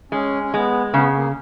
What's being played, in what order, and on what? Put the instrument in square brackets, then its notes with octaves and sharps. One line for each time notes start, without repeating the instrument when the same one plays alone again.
[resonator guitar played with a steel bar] G#3 [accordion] C#4
[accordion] C#4
[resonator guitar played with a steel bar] G#3 [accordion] B3
[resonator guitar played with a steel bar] C#3 [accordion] B3
[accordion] A#3